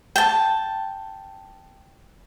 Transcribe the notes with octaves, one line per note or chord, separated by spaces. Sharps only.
G5 A5